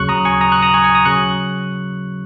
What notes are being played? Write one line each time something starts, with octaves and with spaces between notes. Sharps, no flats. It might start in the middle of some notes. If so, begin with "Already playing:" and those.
Already playing: D#2 C#3 F#3 C#6 F#6
A#5 D#6
G#5 C#6
A#5 D#6
C#6 F#6
A#5 D#6
G#5 C#6
G#5 C#6
A#5 D#6
C#3 F#3 C#6 F#6